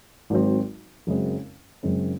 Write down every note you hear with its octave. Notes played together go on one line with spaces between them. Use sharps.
G#1 G#2 F#3 C4
F#1 F#2 C#3 G#3 C4
F#1 F#2 C#3 G#3 C4